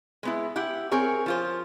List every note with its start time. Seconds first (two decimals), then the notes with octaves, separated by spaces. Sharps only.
0.23 G#3 B3 E4
0.56 E4 G4 F#5
0.91 C4 G#4 A#4 C#5
1.26 F3 F4 C5